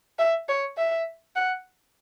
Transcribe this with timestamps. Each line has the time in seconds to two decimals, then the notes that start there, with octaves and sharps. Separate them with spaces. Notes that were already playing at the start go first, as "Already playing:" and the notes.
0.19 E5
0.48 C#5
0.77 E5
1.36 F#5